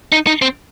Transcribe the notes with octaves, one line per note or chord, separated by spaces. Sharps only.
D#4
D#4
C4